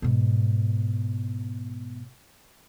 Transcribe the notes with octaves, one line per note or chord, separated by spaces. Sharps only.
G#2 B2